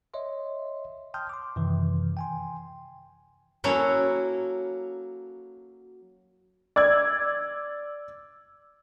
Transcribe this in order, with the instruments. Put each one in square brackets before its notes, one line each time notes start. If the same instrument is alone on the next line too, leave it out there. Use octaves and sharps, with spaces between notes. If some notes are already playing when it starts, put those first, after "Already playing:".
[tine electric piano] C#5 D#5 E5 C6
G5 A5 C6 D#6 F6 G6
C6 D6
F#2 C3 D#3 E3
G5 G#5 C6
[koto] F#3 A#3 C#4 E4 F#4 A4
[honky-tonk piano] D5 E6 G#6